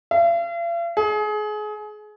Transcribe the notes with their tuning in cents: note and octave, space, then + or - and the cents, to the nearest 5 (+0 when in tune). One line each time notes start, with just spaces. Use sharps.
F5 -45
G#4 +30